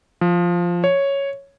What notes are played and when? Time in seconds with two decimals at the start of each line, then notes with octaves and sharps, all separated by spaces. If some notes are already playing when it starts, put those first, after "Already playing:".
0.21 F3
0.84 C#5